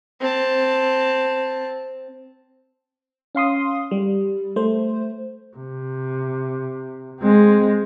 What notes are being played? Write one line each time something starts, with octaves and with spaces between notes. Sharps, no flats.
C4 A5
C#4 F5 C6 D#6
G3
A3 C5
C3
G#3 C4